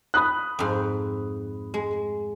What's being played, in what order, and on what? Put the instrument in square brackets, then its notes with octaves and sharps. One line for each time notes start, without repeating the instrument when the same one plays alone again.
[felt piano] B5 D#6 F#6
[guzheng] F2 G#2
G#3